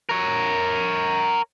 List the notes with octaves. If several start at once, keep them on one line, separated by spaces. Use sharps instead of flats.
A#4 C#5